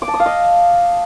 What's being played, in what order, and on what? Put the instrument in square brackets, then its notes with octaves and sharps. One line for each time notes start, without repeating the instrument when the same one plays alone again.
[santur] D6
A5
D#6
F5
D#5